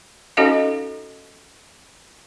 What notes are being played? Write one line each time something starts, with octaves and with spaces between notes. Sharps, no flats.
C#4 D#4 F#4 A4 D#5 F5